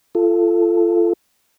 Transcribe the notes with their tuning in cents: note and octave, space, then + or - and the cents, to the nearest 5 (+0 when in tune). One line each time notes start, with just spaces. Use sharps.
F4 -25 A4 +0